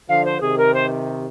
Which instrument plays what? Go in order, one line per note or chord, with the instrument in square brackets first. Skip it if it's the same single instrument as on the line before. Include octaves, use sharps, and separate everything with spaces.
[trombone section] D3 F3 [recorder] F5
[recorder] C5
[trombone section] C3 D#3 [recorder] G#4
[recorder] A#4
C5